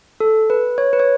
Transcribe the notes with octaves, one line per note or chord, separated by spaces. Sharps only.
A4
B4
C#5
B4
C#5